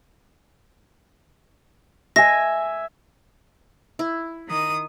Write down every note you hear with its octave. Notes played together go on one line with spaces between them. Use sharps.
E5 G#5 A#6
E4
D#3 D#6